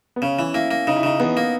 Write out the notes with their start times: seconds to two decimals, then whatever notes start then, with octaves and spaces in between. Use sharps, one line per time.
0.16 B3
0.22 C#3 C#4
0.39 E3
0.54 A#3 E4
0.71 A#3
0.87 C#3 D#4
0.96 E4
1.03 C#3 D#4
1.20 E2 B3
1.37 A#3